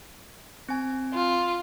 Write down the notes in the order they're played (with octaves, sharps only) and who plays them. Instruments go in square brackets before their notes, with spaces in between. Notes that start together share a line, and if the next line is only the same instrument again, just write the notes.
[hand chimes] C4 G#5
[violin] F4